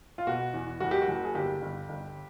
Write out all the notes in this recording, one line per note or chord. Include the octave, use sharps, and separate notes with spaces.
F4
B2 F#4
E2
F#1 F#4
G4
F#4
F#1
G#4
G1 G4
G1
G1